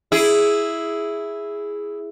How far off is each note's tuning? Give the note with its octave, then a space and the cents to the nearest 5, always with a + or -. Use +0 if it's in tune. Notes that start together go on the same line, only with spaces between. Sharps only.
E4 +0 G#4 +0